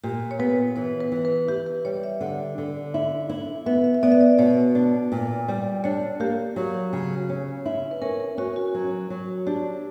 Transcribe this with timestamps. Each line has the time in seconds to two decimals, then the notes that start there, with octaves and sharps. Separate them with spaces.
0.03 A#2 G4
0.31 C#5
0.39 B3 B4
0.76 E3 C#5
1.01 B4
1.12 E3
1.25 B4
1.48 E4 G4
1.67 B4
1.85 G3 C#5
2.04 E5
2.21 D3 F#5
2.58 D3
2.94 E4
3.29 E4
3.66 B3 E5
3.84 E5
3.94 E5
4.03 B3 D5
4.12 E5
4.21 D5
4.38 B2 C#5
4.75 D4
5.12 A#2
5.48 G3
5.84 D4 C#5
6.20 A#3 G4
6.56 F#3
6.93 C#3
7.29 C#4
7.66 E4
7.91 B4
8.01 C#4 A#4
8.20 A#4
8.38 C#4 F#4
8.56 F#4
8.74 F#3
9.10 F#3
9.47 D4 G4